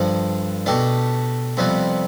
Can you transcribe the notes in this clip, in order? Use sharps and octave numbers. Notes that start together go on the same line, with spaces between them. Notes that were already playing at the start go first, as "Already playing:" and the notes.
Already playing: G2 D3 F3
B2 A3 D4 G4
F2 C3 G3 B3